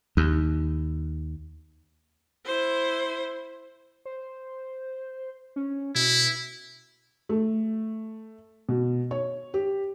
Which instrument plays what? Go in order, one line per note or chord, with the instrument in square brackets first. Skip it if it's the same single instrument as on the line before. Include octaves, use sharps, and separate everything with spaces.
[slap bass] D#2
[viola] E4 C5
[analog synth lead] C5
C#4
[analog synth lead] B2 [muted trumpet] E4
[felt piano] A3
B2
C#5
G4